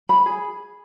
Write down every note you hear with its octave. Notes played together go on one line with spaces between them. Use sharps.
B5
G#4